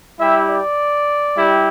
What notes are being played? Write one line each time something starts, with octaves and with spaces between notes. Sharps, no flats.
G3 E4 G4 E5
D5
G3 E4 G4